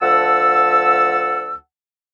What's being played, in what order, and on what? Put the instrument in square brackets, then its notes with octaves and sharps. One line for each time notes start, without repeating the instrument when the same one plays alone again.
[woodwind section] D2 F3 F#5 A5 E6